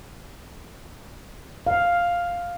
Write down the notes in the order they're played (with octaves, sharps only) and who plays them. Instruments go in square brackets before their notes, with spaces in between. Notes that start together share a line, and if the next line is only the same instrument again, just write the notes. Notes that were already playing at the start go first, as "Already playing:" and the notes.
[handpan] F5